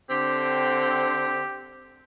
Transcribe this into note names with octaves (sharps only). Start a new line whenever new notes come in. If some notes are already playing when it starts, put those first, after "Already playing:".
D3 C4 G4